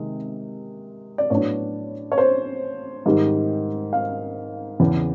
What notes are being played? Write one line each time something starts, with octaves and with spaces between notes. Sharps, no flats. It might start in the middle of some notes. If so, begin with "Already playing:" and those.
Already playing: C3 D#3 G#3
D5
A2 F#3 B3 D4 C#5
C#5
C5
G#2 D#3 G3
F5
E2 C#3 E3